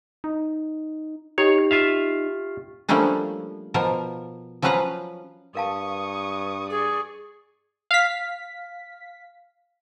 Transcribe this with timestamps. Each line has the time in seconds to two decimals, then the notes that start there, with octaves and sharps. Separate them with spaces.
0.24 D#4
1.38 D#4 G4 C#5
1.71 F4 E5 F5
2.89 F3 G3 A3 A#3 C#4 D4
3.74 B2 F3 A#4
4.62 F3 F#3 C#4 B4 F5 A#5
5.55 G2 A#4 F5 A5 C#6 D#6
6.70 G#4 D5 C#6
7.91 F5 B6